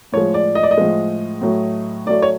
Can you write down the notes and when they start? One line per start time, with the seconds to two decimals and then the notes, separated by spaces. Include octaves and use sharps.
0.12 A2 F3 G#3 C#5
0.34 D5
0.55 D#5
0.63 D5
0.71 D#5
0.77 A2 F3 G#3
1.42 A2 F#3 A3
2.06 A2 F#3 A3 D5
2.22 C#5